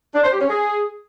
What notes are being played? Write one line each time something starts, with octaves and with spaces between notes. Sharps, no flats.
D4
C5
G4
C#4
G#4